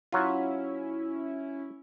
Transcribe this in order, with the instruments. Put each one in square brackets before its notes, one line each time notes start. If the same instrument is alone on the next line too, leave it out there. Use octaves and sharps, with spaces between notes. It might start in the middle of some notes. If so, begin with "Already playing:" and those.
[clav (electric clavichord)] F#3 F4 [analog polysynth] C#4 E4